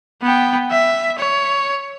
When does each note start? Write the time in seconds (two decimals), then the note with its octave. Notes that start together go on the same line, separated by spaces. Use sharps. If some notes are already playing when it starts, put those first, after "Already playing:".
0.22 B3 G5
0.71 E5
1.19 C#5